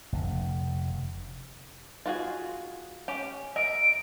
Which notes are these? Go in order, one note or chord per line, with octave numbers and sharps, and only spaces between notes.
F1 D3
F4 F#4 G#4
C#4 G4
A#4 D#5 E5 D7